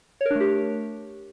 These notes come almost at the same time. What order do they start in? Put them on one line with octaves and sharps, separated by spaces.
C#5 A#4 D4 A3 G4